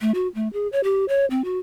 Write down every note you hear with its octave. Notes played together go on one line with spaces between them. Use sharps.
A3
F#4
A3
G#4
C#5
G4
C#5
C4
F#4